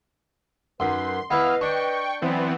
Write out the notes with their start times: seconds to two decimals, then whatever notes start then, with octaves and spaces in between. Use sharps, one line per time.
0.80 F#2 D#4 B4 C6
1.31 B3 E4 B4 D#5 F5
1.61 D4 G5 C#6
2.22 E3 F#3 B3 C4 D5